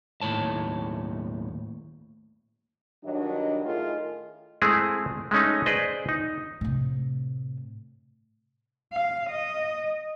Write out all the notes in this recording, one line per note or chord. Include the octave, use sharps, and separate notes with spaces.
D#2 A2 C#5 A5
G2 D#3 F#3 D4 C#5 D#5
A2 D#3 A3 F4 G#4 D#5
G#3 A3 C4 E4 G#4
G#3 A3 C#4 D#4
G#4 B4 C5 D5 D#5
D#4
A2 C3
F5
D#5